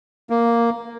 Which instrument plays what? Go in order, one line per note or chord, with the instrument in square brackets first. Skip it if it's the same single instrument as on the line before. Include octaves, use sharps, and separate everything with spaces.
[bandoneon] A#3